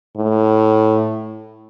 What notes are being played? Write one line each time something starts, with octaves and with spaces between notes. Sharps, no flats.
A2